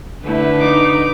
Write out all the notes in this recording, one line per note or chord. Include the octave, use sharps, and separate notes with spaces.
D3 A3 E4 B4
D#4 D6